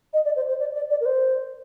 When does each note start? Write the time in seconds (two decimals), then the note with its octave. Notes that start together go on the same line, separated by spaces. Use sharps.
0.13 D#5
0.25 D5
0.36 C5
0.49 C5
0.60 D5
0.74 D5
0.90 D5
1.01 A#4
1.05 C5